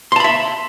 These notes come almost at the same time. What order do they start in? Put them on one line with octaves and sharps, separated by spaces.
C6 A5 B5 E5